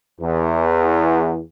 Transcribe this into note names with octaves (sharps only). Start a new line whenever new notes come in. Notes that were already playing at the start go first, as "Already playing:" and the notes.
E2